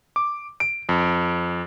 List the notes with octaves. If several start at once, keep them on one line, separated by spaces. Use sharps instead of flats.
D6
D7
F2